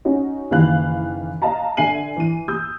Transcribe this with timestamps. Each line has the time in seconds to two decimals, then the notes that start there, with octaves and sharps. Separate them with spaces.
0.05 C#4 D#4 F#4
0.51 F#1 D#3 E3 B4 F5 F#6
1.42 D#5 F5 A5 A#5
1.77 D3 E5 G#5 C7 D#7 F#7
2.16 E3 D#7
2.48 D#6 E6 G6